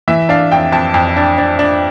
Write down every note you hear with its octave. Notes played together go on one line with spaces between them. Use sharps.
E3 E5
D4 F5
F2 G5
F2 A5
F2
D4
D4
D4